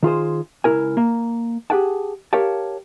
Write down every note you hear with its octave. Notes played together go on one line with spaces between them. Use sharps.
D#3 F4 G#4 C5
C#2 C#3 E4 A#4 G#5
A#3
G4 G#4 F#5 G5 A5
G4 A#4 C#5 F5 G5 A5